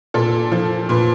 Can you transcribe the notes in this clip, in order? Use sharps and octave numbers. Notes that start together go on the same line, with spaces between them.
A#2 A4
F3
A#2 B4